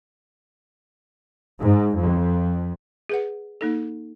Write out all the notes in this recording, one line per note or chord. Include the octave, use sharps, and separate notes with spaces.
G#2
F2
G#4 B4 F#5
A#3 D#4 A4